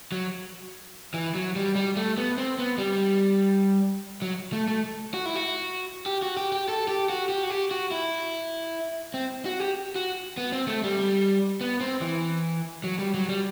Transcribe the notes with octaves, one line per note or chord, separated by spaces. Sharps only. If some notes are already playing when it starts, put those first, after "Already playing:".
F#3
E3
F#3
G3
G3
A3
B3
C4
B3
G3
F#3
A3
A3
F#4
E4
F#4
G4
F#4
G4
G4
A4
G4
F#4
G4
F#4
G4
F#4
E4
C4
F#4
G4
F#4
B3
C4
A3
G3
B3
C4
E3
F#3
G3
F#3
G3